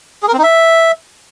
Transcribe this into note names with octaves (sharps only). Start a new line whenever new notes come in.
G#4
A#4
C4
D#4
E5